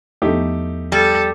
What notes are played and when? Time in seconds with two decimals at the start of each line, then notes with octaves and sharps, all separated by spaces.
0.22 E2 F3 A3 B3 D#4 G4
0.92 G3 A4